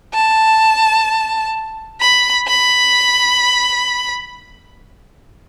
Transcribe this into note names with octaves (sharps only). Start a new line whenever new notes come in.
A5
B5
B5